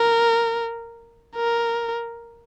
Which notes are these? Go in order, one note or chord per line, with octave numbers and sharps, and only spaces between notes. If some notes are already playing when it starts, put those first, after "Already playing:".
Already playing: A#4
A#4